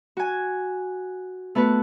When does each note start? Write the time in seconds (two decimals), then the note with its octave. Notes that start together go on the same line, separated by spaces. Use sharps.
0.17 F#4 G#5
1.55 A3 B3 F#4 B4